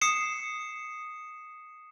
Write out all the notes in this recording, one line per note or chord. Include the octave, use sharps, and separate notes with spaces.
D#6 C7 C#7 E7